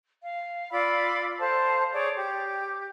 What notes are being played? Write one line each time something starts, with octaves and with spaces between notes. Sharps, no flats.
F5
F4 D5 B5 E6
A4 C5 F5 A5
G#4 C#5 D5
G4